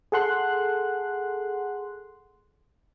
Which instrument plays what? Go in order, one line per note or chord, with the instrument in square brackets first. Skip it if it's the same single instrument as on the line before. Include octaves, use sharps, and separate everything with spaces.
[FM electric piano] G#4 A4 F#5 C6 F#6